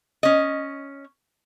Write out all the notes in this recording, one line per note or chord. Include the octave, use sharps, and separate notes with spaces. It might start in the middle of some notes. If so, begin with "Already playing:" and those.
C#4 D#5